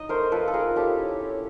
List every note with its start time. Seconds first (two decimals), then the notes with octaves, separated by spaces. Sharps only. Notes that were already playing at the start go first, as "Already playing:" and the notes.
Already playing: D#4 D#5
0.09 A3 A#4 C5
0.32 F3 A4 B4
0.48 A4
0.54 F3 G#4 A#4
0.76 C#4 G4 A4
0.98 E4
1.21 C#4